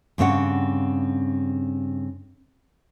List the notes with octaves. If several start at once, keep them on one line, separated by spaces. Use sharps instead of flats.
G2 C#3 C4 C#5 F#5